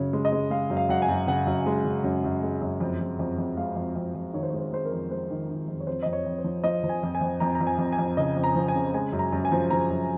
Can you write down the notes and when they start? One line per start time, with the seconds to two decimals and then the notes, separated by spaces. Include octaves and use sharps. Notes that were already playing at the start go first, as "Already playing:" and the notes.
Already playing: F#2 C#3 C#5
0.13 G#3
0.25 D#5
0.32 G#3
0.50 G#3 F5
0.70 F#2
0.77 F5
0.89 F#2 F#5
1.02 G#5
1.09 F#2
1.27 C#3 F#5
1.47 F#2
1.66 G#3
1.84 C#3
2.04 F#2
2.24 F#2
2.43 G#3
2.62 F#2
2.80 F2
3.01 F2
3.19 F2
3.38 F2
3.57 G#3 F5
3.76 F2
3.95 F2
4.15 F2
4.34 D#3 C#5
4.43 C5
4.50 G#3 C#5
4.59 C5
4.72 G#3 C5
4.85 A#4
4.92 F2
5.11 G#3 C5
5.31 D#3
5.50 D#3
5.68 F2
5.80 C#5
5.87 F2 C5
6.03 F2 D#5
6.13 C#5
6.26 F2
6.38 C5
6.44 F3
6.64 F3 D#5
6.84 F3
6.89 G#5
7.03 F2
7.15 G#5
7.21 F2
7.40 F2 A#5
7.55 A#5
7.61 F2
7.67 G#5
7.78 F2
7.92 G#5
7.99 F2
8.17 C#3 D#5
8.36 F2
8.44 A#5
8.56 F3
8.68 G#5
8.76 C#3
8.94 G#3 G#5
9.13 F#2
9.19 A#5
9.33 F#2
9.45 G#5
9.52 F3
9.70 F3 A#5
9.90 F#2